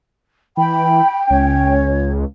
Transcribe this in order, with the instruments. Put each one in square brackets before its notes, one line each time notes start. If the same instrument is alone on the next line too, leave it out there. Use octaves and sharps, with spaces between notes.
[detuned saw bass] E3 [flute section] G5 [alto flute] B5
[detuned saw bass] C#2 [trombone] C#4 [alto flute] C#5